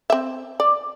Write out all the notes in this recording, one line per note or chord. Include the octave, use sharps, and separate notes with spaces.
C4 E5
D5